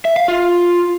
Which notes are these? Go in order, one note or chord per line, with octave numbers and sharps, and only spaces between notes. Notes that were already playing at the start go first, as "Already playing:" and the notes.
E5
F5
F4